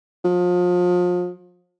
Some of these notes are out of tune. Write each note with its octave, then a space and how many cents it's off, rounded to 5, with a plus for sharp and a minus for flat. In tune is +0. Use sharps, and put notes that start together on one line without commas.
F3 +35